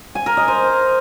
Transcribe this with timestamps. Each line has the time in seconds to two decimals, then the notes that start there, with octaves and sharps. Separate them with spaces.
0.15 G#5
0.26 A#4
0.37 D#5
0.48 C5